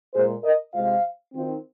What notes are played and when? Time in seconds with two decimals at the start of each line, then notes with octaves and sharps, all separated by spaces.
0.13 A#2 G#3 F4 G#4 C5
0.43 A#4 D#5
0.74 C3 G#3 F4 C5 F5
1.34 D#3 C4 F4